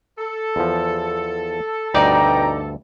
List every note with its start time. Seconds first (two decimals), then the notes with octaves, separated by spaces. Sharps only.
0.17 A4
0.56 E2 F3
1.94 D2 G2 B2 D#4 D5 G5 A#5